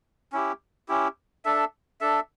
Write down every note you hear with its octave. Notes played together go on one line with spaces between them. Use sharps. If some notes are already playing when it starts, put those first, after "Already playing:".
C#4 E4 G4
C#4 E4 G4
D4 A4 E5
D4 A4 E5